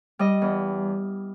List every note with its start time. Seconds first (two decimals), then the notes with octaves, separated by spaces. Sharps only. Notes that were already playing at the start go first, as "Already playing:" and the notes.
0.19 G3 D#5
0.42 E2